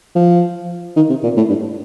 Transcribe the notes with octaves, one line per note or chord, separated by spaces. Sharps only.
F3
D#3
C3
A#2
A2
G2